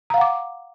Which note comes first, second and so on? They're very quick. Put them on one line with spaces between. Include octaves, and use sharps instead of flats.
A#5 F5 F#5 D6